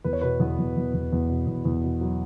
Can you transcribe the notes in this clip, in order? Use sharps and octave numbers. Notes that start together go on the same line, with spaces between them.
E2 B4
C#5
B2 B4
E2 B3
E2
E2
E2
E2
B2
E2
E2
B2
F#3